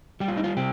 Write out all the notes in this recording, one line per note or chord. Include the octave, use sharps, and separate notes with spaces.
G3 G4
F4
D#4
F4
C3 G4